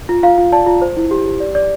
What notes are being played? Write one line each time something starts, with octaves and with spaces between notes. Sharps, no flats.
F4
F4 F5
F4
D5 A5
F4
C5
E4
G4
G4
D5
D5